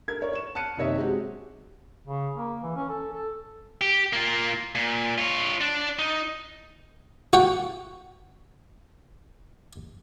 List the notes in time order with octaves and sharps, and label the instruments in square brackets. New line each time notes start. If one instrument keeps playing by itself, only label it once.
[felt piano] A4 A#4 G#6
A#4 C#5 D5
C#6 E7
A5 F6 F#6 C#7 D#7
F#1 C3 D#3 C#5 D#5 E5
G#3 C4 F#4 G4
[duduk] C#3
A#3
E3
C#4
A4
A4
[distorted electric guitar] G4
A#3 F4
A#2
F4 C#5
D4
D#4
[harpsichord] F#4 F#5 G5